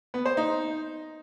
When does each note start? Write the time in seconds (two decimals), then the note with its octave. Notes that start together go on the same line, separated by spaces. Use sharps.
0.14 B3
0.26 C5
0.37 D#4